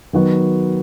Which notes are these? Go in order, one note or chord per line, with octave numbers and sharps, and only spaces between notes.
D#3 F#3 B3 F#4